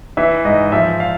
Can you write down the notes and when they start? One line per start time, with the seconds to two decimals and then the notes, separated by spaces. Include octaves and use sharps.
0.17 E3 E5
0.45 G#2 D#5
0.72 F3 E5
1.00 F5